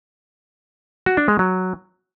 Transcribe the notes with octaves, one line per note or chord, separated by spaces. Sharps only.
F#4
D4
G#3
F#3